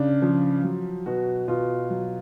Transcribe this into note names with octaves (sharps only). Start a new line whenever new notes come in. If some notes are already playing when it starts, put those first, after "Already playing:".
Already playing: C#3 D4
F3
F#3
B2 F#4
B2 F4
F#3